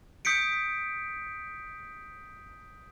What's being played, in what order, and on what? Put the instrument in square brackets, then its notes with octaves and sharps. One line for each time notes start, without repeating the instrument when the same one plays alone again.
[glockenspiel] D#6 G6 B6 C#7 D7